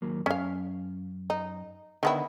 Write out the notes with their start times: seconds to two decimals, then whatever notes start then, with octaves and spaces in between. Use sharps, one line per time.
0.02 D#2 F#3 A#3
0.26 F#2 C#4 F5
1.30 D#4
2.03 D3 D#3 B3 E4 D5 F#5